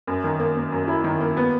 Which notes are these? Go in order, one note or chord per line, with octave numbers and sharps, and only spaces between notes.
F#2
D#3
A#3
A#3
F#2
E4
D#3
A#3
B3